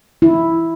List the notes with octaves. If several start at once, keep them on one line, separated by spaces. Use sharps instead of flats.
E4